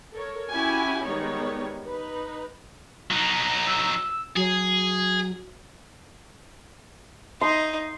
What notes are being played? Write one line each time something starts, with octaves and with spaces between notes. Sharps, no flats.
A4 A#4 C#5
C#4 E4 F#4 G4 G#5
D#3 G3 G#3 B3 D#4 C#5
D#4 B4
F#3 D#4
E6
F#3 G#4
D#4 D#5 C6